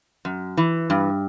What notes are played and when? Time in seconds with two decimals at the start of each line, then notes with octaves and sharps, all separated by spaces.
0.25 F#2
0.57 E3
0.90 G2